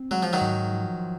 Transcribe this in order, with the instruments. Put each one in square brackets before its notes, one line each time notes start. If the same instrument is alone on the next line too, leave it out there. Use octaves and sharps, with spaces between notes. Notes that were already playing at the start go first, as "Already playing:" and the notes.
Already playing: [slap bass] C4
[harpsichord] F#3 [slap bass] G#3
[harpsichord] F3
D#3 F#3
[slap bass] G#2
F3